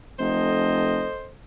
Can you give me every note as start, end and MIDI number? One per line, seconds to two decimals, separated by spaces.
0.19 1.07 29
0.19 1.29 69
0.19 1.29 72
0.19 1.29 75